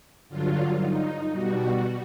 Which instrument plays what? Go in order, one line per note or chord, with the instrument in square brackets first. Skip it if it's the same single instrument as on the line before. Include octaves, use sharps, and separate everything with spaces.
[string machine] G2 D3 F#3 F4
D#4
B2 G3 F#4